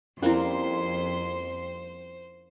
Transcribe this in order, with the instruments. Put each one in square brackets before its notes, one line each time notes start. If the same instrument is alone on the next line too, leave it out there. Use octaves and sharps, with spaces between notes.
[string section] F2 C6 [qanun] G3 A#3 C4 [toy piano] C#4 E4 [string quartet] C5